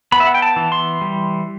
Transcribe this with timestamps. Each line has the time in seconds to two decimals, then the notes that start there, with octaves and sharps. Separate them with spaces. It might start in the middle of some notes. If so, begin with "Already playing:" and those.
0.12 B3 B5
0.20 E5
0.27 F#5
0.34 G5
0.42 A5
0.56 E3
0.72 C6
1.01 G3